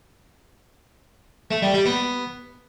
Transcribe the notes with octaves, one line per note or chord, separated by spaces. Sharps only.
A3
G3
G3
B3